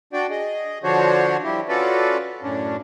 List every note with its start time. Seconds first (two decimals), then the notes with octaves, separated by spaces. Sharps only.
0.13 D4 F#4 D5 G5
0.30 G#4 D#5
0.83 D3 F3 D4 F#4 C5 C#5
1.44 F3 G3 E4 G4
1.69 C#4 F4 F#4 A4 B4 D5
2.43 F#2 A2 C#4 D4